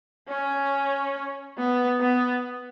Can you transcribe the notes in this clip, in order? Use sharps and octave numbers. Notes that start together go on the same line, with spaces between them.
C#4
B3
B3